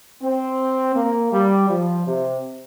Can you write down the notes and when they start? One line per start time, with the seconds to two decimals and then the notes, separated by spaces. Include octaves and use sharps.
0.22 C4
0.96 A#3
1.33 G3
1.69 F3
2.06 C3